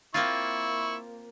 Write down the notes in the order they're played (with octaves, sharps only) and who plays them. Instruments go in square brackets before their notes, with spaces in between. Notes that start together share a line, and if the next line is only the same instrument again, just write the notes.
[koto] A#3 C4 F4 [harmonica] E4 C#6